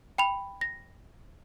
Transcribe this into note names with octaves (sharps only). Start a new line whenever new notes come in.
G5 B5 F7
A#6